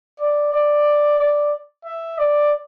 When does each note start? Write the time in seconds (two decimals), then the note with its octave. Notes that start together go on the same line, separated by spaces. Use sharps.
0.20 D5
0.53 D5
1.18 D5
1.85 E5
2.18 D5